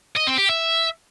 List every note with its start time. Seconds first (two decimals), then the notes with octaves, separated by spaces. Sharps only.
0.17 D#5
0.28 C4
0.38 G4
0.49 E5